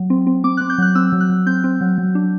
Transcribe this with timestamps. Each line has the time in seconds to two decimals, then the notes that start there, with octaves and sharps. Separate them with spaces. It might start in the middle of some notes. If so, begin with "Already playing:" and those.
Already playing: F#3
0.10 C4
0.27 C4
0.44 C4 D6
0.57 C4 F#6
0.70 G6
0.78 F#3 F#6
0.95 C4 E6
1.12 F#3
1.20 F#6
1.30 F#3
1.46 C4 G6
1.64 C4
1.81 F#3
1.98 F#3
2.15 D4